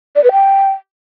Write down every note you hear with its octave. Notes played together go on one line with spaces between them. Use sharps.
D5
B4
G5